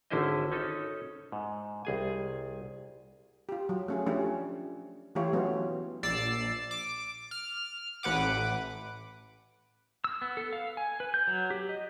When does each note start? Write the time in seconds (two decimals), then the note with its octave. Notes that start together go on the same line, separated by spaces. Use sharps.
0.10 G#1 D3 C#4 E4 C5 D#5
0.52 C#4 D#4 A4
1.32 G#2
1.85 C2 G#4 G#5
3.49 F4 G4
3.69 F#3
3.88 A3 C#4 G#4
4.06 F3 A3 C#4 D4 G4
5.15 E3 A3 E4 F4 G4 C#5
5.33 F#3 A3 B3 C#4 F#4
6.03 A#1 D5 E6 A6 C7
6.71 D6
7.31 F6
8.03 A1 B4 F#5 D6
10.04 E6
10.22 B3
10.37 A4
10.53 F5
10.77 G#5
11.00 B4
11.14 G6
11.27 F#3
11.50 G4
11.69 D#5